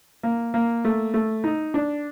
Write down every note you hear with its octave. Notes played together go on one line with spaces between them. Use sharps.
A#3
A#3
A3
A3
D#4
D4